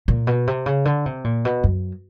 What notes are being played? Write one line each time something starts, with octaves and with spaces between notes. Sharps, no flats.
A#2
B2
C3
C#3
D3
C3
A#2
B2
F#2